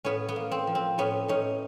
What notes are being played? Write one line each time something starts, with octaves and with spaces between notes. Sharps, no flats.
A2 B3 C#4
B3
A#3
C4
F3
C4
A2 B3 C#4
A2 C#4 D#4